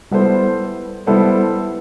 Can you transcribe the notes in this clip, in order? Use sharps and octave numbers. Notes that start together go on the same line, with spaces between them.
G3 B3 E4 A4 C5
G3 B3 E4 A4 C5